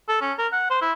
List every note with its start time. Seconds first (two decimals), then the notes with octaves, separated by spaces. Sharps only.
0.09 A4
0.21 C#4
0.38 A#4
0.52 F#5
0.70 C5
0.81 E4